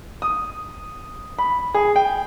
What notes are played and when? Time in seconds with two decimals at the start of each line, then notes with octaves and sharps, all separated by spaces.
0.22 D#6
1.39 B5
1.74 G#4
1.96 G5